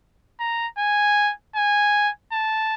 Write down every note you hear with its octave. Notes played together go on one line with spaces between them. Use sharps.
A#5
G#5
G#5
A5